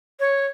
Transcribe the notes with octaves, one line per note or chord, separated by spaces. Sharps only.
C#5